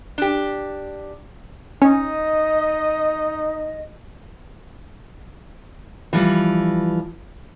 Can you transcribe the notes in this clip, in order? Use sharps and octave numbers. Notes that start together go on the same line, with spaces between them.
D4 G4
C#4 D#4 D#5
E3 F3 G3